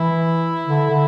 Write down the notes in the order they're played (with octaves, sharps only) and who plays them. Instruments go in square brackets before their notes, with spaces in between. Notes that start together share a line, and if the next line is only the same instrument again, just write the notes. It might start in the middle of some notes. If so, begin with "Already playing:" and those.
Already playing: [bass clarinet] E3 [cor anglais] E4
[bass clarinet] D3
D3